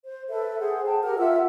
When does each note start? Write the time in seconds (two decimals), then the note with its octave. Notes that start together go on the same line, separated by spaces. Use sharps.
0.04 C5
0.29 A4 B4 E5
0.59 G#4 C5 F#5
0.85 G5 A5
1.02 G4 A#4 F#5 F6
1.18 F4 E5 F#5 E6